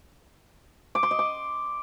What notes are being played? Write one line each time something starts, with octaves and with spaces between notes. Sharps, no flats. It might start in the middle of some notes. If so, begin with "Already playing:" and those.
D6
C6
D#5
D6